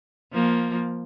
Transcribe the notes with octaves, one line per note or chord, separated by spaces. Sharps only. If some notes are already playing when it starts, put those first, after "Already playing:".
F3 A#3